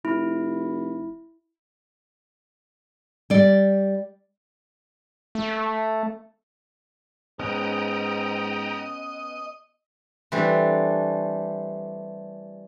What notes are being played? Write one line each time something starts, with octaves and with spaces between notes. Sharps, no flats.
F1 E4
G3 D5
A3
G#2 B3 C#4 D#5 G5 A#5
E3 G3 A3 C4 D4